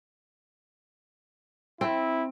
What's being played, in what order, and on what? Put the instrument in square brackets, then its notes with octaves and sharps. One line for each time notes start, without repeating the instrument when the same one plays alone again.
[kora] C4 [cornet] E4